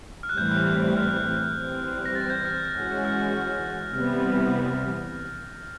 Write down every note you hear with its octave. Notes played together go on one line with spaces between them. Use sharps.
F6
F#6
A2 E3 G3 C4 G6
F#6
F6
E3 G3 C4
A#6
A6
G6
F6
E3 G#3 C#4 F#4
F6
C3 E3 G3 B3 F6